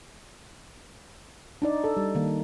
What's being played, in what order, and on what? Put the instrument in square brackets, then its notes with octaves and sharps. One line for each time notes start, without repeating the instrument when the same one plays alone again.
[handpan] D4 D#4 D5
A4
G3
D#3 A#3